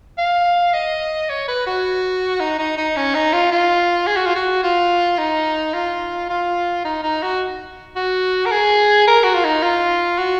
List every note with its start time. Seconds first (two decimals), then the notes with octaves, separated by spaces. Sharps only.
0.18 F5
0.74 D#5
1.29 C#5
1.48 B4
1.66 F#4
2.40 D#4
2.59 D#4
2.77 D#4
2.96 C#4
3.15 D#4
3.33 F4
3.51 F4
4.07 G#4
4.16 F#4
4.26 F4
4.35 F#4
4.63 F4
5.18 D#4
5.74 F4
6.30 F4
6.85 D#4
7.03 D#4
7.22 F#4
7.96 F#4
8.46 A#4
8.51 G#4
9.08 A#4
9.24 F#4
9.34 F4
9.44 D#4
9.63 F4
10.18 F#4